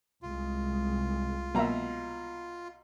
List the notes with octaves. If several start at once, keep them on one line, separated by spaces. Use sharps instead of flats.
C2 G#3 F4
B2 F#3 A#3 E5 A#5